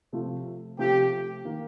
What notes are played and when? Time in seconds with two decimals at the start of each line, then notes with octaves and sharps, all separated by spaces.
0.13 C3 F3 A3 C4 F4
0.78 C3 F3 A3 C4 F4 G4
1.45 D#3 A#3